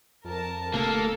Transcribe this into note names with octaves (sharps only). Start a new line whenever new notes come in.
F2 A#4 A5
D1 C3 A3 A#3 A4